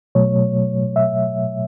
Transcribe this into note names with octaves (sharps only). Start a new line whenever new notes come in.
B2 F#3 A3 C#5
E5